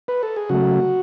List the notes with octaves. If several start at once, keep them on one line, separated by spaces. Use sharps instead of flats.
B4
A4
G#4
C#3 F#3 A3 F#4